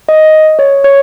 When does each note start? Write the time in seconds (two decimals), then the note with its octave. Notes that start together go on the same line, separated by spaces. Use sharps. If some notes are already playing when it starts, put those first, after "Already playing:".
0.09 D#5
0.59 C#5
0.84 C#5